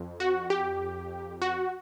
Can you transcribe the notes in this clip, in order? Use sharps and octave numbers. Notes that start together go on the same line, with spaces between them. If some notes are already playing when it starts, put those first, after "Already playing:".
Already playing: F2
F#4
G4
F#4